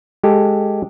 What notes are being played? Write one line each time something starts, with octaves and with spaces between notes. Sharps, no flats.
G#3 G4 A4